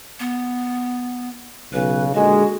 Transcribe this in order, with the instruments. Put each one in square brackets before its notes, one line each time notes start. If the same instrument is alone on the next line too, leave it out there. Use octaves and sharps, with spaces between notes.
[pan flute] B3
[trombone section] B1 C#3 [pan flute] B4
[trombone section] A#2 D3 G#3 [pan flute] F#4